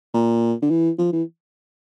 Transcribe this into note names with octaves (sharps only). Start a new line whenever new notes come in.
A#2
D3
E3
F3
E3